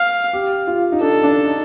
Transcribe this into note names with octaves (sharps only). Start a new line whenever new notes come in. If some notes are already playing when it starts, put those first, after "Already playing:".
Already playing: F5
G4
F4
D#4
D4 A4
D4
D#4